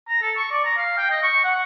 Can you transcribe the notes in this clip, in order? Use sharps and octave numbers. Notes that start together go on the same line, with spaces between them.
A#5
A4
C#6
D5
A#5
F5
G5
D#5
C#6
F#5